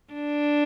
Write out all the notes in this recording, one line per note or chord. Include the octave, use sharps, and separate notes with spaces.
D4